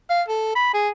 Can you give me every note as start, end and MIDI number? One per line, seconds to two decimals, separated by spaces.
0.10 0.22 77
0.28 0.52 69
0.55 0.72 83
0.74 0.89 68